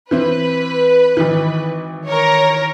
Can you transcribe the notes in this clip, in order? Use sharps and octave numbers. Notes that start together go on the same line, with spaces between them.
E3 C4 E4 B4
G#1 E3
A#4 C#5